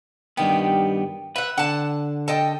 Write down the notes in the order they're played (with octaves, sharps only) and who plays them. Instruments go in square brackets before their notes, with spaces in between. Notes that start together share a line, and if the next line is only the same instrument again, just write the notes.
[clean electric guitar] G2 D#3 B3 [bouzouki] G4
[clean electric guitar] B4 [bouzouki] E5 F#5
[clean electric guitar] D3 [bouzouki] F#5 A5
[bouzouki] A4 D#5 G5